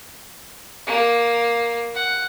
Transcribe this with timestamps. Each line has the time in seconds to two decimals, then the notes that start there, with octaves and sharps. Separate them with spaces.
0.87 A#3
1.95 F#5